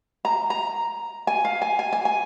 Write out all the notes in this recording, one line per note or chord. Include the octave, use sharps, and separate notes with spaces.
A#5
A#5
G#5
F5
G#5
G#5
G#5
G#5